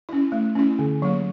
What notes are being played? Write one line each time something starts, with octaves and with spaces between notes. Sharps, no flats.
C#4 E4
A3
C#4 E4
D3
F#3 A#3